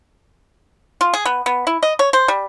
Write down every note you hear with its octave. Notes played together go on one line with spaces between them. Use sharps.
F4
G#4
B3
B3
E4
D#5
C#5
C5
G3